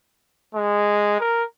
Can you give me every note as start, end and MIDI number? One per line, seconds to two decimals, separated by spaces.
0.55 1.17 56
1.20 1.44 70